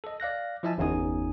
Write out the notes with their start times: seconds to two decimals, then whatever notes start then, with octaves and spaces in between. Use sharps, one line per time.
0.04 A4 D#5
0.20 D5 F5 F#6 A#6
0.63 F3 E4 D#5 E5 G#5 A5
0.78 G1 E2 C#4 D#4 G#5 D#6